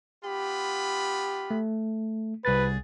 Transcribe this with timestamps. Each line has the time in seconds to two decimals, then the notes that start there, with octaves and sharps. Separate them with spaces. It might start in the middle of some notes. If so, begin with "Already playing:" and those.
0.25 B3 F4 G4 B5
1.51 A3
2.45 C2 F#4 G#4 B4 A6